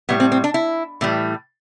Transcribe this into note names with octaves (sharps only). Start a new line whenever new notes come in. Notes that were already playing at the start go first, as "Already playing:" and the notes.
A2 G3 B3
C4
C4
D4
E4
A2 E3 G3